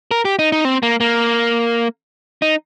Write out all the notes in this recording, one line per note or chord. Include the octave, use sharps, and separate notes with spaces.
A#4
G4
D#4
D#4
C4
A#3
A#3
D#4